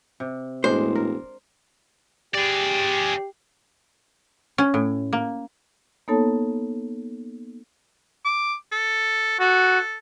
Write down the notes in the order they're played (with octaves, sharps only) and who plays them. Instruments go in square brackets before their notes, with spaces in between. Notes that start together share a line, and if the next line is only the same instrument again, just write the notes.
[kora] C3
[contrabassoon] E1 [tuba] A2 [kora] G#3 D4 [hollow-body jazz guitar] C5
[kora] A#4
[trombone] G4 [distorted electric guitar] G#4 D5
[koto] C#4
A2
A#3
[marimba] A#3 B3 D#4 A4 C#5 A5
[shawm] D6
A4
[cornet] F#4 [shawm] A4